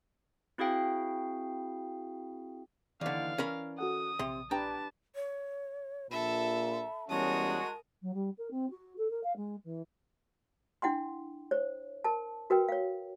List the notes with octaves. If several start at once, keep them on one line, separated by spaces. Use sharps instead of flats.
C4 E4 F#4 G#4 F5 G5
D#2 D3 E3 D5 F5
C#4 A#4 B5
F#4 A4 F#5 D#6
A#1 C3 C6
D4 G4 B4 G5 A5 A#5
C#5
A#1 A#2 A4 E5 B5
E2 G3 G#3 C#4 F#4 A#4 A5 D#6
F#3
G3
A#4
C4
F#4
A4
A#4
F5
G#3
E3
D4 E4 F#5 G5 C6
C5 C#5
A#4 A5
F#4 A#4 B4 G5
C#5 F5